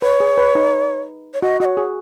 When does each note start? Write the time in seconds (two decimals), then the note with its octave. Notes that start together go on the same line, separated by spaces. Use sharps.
0.02 B4 C#5
0.20 G#4
0.37 B4
0.55 D#4
1.34 C#5
1.42 F#4 D#5
1.60 F#4 D#5
1.65 C#5
1.77 G#4